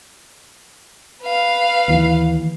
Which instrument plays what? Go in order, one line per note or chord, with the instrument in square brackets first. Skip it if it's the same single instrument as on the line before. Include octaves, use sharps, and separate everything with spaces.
[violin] B4 F5
[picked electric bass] D#2 E3